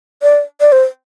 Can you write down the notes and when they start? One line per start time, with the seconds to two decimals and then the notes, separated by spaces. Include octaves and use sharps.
0.22 D5
0.61 D5
0.72 C5